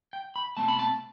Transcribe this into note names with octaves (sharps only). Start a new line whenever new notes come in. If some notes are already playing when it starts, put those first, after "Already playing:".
G5
B5
B2 A3 C4 A5
B5
A5